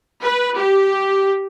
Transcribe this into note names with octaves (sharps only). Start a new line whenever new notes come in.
B4
G4